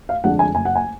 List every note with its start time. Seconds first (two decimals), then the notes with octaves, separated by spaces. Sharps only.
0.09 F5
0.24 F2 D3 G#3 D4 F#5
0.39 G#5
0.55 F#1 G#5
0.65 F#5
0.75 G#5